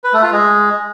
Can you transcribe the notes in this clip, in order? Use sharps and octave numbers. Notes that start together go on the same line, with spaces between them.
B4
A3
F4
G#3